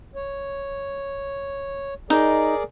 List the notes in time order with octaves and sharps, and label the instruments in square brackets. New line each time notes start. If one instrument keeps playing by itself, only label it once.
[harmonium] C#5
[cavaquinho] D#4 [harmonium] G#4 A#4 D5